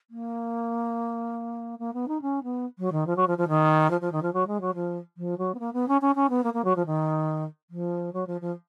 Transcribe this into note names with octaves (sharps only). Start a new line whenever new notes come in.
A#3
A#3
B3
D#4
C#4
B3
F#3
D#3
F3
F#3
F3
F3
D#3
F3
F3
D#3
F3
F#3
G#3
F#3
F3
F3
F#3
B3
A#3
B3
C#4
C#4
C#4
B3
A#3
A#3
F#3
F3
D#3
F3
F#3
F3
F3